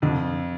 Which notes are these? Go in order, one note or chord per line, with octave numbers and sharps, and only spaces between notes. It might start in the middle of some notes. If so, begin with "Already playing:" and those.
F2 D3